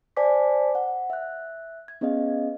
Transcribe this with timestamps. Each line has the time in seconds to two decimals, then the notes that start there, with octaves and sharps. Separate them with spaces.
0.16 C5 D5 G#5 A5 D6 B6
0.75 F#5
1.10 E5 F#6
1.88 G#6
2.01 B3 C#4 G#4 D#5 F5